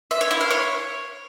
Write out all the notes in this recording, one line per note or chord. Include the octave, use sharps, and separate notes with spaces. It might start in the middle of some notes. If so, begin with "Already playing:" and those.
E5
C#5
E4
F5
C#5